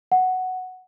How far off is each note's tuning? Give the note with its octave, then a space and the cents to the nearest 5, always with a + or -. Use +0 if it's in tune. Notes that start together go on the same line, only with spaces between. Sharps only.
F#5 +5